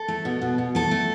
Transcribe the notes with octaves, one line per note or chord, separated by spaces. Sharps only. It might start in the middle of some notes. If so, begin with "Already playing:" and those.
Already playing: A4
A3
B2
B2
B2
A3 A4
A3